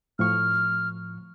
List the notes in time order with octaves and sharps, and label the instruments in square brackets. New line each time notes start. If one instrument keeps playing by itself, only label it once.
[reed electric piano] A2 F3 C#6 [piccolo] F6